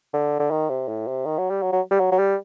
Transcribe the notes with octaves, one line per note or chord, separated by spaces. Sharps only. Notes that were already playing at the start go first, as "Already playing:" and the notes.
D3
D3
D#3
C3
A2
C3
D#3
F#3
G3
F#3
F#3
G3
F#3
F#3
G3